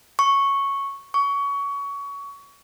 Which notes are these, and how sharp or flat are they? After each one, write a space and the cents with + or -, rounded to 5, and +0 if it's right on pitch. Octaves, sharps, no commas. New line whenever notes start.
C#6 -5
C#6 +25